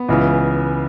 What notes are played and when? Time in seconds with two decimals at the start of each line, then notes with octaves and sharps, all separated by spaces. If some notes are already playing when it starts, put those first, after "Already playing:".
Already playing: B3
0.09 C#2 C#3 E3